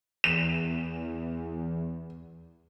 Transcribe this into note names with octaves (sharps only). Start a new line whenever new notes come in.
E2 E7